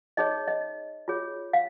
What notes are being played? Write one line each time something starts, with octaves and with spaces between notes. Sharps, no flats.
D#4 G#4 C#5 D#5
D#5
F4 G#4 C#5
F5